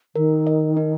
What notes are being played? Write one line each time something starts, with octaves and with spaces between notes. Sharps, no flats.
D#3 A#4
D#5
D#4